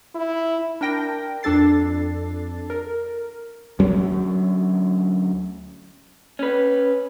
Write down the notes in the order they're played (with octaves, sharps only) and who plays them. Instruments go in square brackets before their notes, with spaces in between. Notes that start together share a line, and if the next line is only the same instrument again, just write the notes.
[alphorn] E4
[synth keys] D4 A#4 G5 A#6
F2 D4 A4 A6 C7
A#4
[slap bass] D2 F#3 C#4
[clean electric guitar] C#4 B4